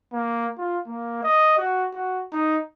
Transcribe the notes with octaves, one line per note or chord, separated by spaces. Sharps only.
A#3
F4
A#3
D#5
F#4
F#4
D#4